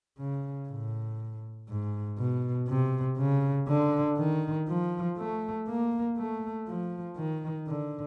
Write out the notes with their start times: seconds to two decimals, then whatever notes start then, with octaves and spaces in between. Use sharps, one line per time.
0.19 C#3
0.69 A2
1.69 G#2
2.18 B2
2.68 C3
3.18 C#3
3.68 D3
4.18 D#3
4.68 F3
5.18 A3
5.68 A#3
6.18 A3
6.68 F3
7.17 D#3
7.68 D3